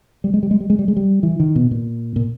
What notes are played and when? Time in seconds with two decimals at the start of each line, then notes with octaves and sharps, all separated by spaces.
0.24 G3
0.34 G#3
0.43 G3
0.51 G#3
0.60 G3
0.70 G#3
0.79 G3
0.88 G#3
0.96 G3
1.23 E3
1.40 D#3
1.56 B2
1.71 A#2
2.16 A#2